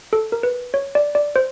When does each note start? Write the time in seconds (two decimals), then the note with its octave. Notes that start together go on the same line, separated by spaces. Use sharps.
0.13 A4
0.32 A#4
0.43 B4
0.74 C#5
0.95 D5
1.15 D5
1.36 C5